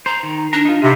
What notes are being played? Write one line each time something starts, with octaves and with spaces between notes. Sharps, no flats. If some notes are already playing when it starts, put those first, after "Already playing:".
C5 A#5
D#3
D4 A#4 A#5
D#4 F4
C3 D#5 F5 B5